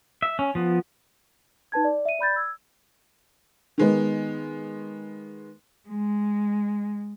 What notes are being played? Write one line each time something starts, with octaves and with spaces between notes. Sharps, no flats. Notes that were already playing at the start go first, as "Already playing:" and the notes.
E5
C#4
F3 B3
D#4 B4 A5 G#6
D5
E5 D#7
D5 B5 G6 A6
E6 G#6
D#3 G#3 B3
G#3